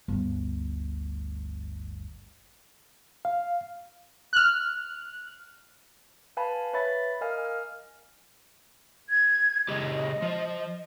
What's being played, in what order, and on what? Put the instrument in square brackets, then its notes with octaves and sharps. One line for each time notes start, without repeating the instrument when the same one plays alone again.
[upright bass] G1 D2
[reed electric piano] F5
[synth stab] F6 F#6
[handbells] B4 F5 G#5 A5 B5
B4 C#5 E5 B5 A6
A#4 D#5 F5 G#5 F6
F6
[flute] G#6
[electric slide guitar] C#3 G#3 G4 [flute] D#5
[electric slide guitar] F3 C5